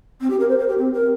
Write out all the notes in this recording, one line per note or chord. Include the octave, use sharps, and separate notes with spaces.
C4
G4
A#4
C5
A#4
G4
C4
A#4